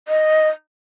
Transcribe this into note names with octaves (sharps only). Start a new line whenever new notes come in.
D#5